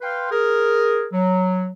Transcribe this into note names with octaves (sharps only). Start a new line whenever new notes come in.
B4 F5 G5 C6
G#4 A#4
F#3